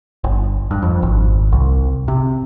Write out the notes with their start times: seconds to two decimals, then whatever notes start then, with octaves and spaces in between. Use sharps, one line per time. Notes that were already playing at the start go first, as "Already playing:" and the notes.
0.24 G1
0.71 G2
0.82 F2
1.03 G#1
1.52 C2
2.08 C3